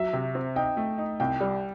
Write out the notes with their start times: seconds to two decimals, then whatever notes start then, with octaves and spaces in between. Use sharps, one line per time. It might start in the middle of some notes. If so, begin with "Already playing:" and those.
Already playing: F#3 E5
0.13 C3
0.35 C4
0.56 D#4 G5
0.77 A3
0.98 D#4
1.20 C2 G5
1.41 G3